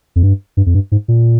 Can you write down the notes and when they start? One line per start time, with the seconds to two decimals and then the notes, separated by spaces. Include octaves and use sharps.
0.16 F2
0.23 G2
0.57 G2
0.66 F2
0.74 G2
0.92 G#2
1.08 A#2